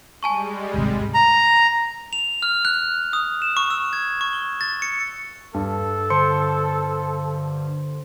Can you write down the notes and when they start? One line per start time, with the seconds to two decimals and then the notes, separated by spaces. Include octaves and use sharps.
0.23 G3 G#3 G#5 A5 C#6
0.74 D1 G#1 C3
1.14 A#5
2.13 F7
2.42 F6
2.65 F#6
3.13 D#6
3.42 E7
3.57 C#6
3.70 E6
3.93 G#6
4.21 C#6
4.33 G7
4.61 A6
4.82 C#7
5.54 G2 A4
6.10 D3 C5 C6 C#7